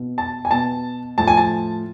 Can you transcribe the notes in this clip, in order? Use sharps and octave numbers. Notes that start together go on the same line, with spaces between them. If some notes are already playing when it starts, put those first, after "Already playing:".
Already playing: B2
A5
G#5
B2 A5
A2 F3 A5
G#5
A5